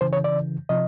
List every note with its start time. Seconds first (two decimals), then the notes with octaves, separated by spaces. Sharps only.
0.01 C#3 E3 C5
0.13 C#5
0.24 D5
0.69 C3 F3 D#5